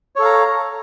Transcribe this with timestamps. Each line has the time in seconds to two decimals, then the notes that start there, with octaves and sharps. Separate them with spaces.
0.16 C#5
0.19 A4
0.22 F5
0.25 A#5